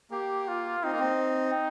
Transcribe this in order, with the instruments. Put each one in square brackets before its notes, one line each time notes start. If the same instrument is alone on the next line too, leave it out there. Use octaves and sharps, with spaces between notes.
[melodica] A#3 [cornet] G4
[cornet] F4
[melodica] C4 [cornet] D#4
[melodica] A#3
C4